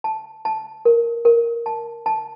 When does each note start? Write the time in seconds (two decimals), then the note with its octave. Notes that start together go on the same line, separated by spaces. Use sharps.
0.04 A5
0.45 A5
0.85 A#4
1.25 A#4
1.66 A5
2.06 A5